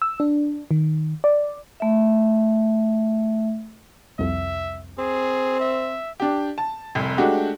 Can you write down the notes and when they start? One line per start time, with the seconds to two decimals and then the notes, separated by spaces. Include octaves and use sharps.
0.02 E6
0.20 D4
0.71 D#3
1.24 D5
1.80 A3 E5
4.19 C2 F2 E5
4.98 C4 G#4
5.60 E5
6.20 D4 G4
6.58 A5
6.95 F1 C2
7.18 G#3 A3 D4 F#4 G4